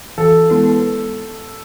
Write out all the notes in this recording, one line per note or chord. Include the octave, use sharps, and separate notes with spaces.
E3 A4
G#3 B3 E4 B4